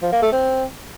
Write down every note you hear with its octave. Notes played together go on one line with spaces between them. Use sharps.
F3
A#3
A3
C4